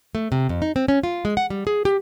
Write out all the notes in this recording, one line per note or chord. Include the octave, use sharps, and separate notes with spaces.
A3
C3
F2
D#4
C4
C#4
F4
G#3
F#5
G3
G#4
G4